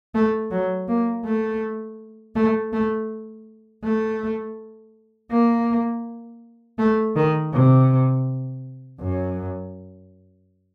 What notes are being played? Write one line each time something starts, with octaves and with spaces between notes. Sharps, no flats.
A3
F#3
A#3
A3
A3
A3
A3
A#3
A3
D#3
C3
F#2